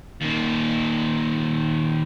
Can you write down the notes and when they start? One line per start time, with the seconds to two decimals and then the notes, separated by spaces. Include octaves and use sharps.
0.21 D#2 A#2